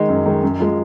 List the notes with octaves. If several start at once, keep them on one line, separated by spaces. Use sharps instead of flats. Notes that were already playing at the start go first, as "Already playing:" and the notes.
Already playing: D#3 G#3 D#4
F#2
D#3 G#3
F#2
F3 G#3